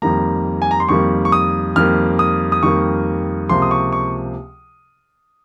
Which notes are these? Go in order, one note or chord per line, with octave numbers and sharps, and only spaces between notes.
F2 D#3 G3 A#3 A#5
G#5
A#5
C6
F2 D#3 G3 A#3 C#6
C#6
D#6
F2 D#3 G3 A#3 F6
D#6
D#6
F2 D#3 G3 A#3 C#6
C#2 C3 F3 A#3 C6
D#6
C#6
C#6